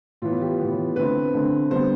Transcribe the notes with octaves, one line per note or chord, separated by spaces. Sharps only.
A2 E3 B3 F4
G4
A2 E3 B3
D3 A3 C4 B4
D3 A3 C4
D3 G3 B3 C5